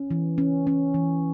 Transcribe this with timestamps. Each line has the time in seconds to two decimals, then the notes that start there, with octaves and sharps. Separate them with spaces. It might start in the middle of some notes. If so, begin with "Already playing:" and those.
Already playing: C#4
0.11 E3
0.38 C#4
0.67 C#4
0.94 E3